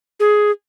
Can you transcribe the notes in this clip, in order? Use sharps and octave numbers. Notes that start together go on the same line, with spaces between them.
G#4